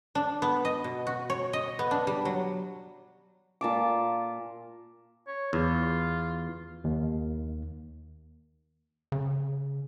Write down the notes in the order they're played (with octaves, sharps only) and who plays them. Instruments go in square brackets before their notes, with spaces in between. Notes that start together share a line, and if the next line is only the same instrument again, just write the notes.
[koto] D4
B3
D#5
B2
F#4
C#5
D#5
B3
D4
G3
F#3
[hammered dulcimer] A#2 A5 D6
[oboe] C#5
[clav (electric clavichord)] E2 [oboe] F4
[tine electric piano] D#2
[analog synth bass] C#3